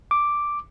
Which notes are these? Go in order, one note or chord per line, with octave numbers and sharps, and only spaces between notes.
D6